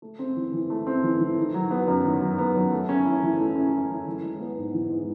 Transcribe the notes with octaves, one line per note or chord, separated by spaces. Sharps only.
A3
C4
E3
E3
A3
C4
E3
E3
D#3
F#3
B3
F#2
D#3
F#3
B3
F#2
A3
C#4
E4
E3
A3
C#4
E4
E3
E3
G#3
B3
G#2
E3
G#3